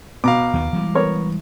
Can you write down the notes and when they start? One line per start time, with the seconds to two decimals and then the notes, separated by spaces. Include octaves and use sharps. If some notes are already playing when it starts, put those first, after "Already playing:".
0.24 B2 F5 A#5 D6
0.53 D#2 D#3 B3
0.73 E3 G3 G#3
0.95 B3 A#4 C#5